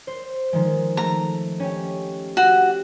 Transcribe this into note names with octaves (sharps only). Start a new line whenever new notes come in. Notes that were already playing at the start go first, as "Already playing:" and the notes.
C5
D#3 F3 G#3
A3 A#5
C#4 G4
F#4 G4